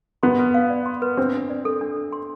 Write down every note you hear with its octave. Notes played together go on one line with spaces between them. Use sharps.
B3 C6
B4
F5
D5
C6
B4
C4 D4
D4
D5
A4
D4
D4
C6